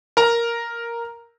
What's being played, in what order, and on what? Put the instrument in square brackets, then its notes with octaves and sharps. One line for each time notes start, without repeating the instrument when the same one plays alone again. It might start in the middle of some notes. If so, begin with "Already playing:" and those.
[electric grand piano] A#4 A#5